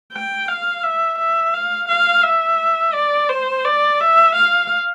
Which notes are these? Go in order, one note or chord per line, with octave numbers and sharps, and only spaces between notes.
G5
F5
E5
E5
F5
F5
E5
D5
C5
D5
E5
F5